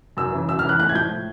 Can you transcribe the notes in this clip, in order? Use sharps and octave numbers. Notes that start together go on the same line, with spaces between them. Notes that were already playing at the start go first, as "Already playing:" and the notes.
F#2 E6
C#3 E3
F#2 E6
F6
C#3 E3 F#6
A2 F#6
G#6
F3 G6
A2